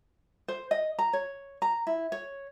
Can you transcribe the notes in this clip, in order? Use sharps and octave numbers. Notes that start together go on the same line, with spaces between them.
C5
D#5
A#5
C#5
A#5
E4
C#5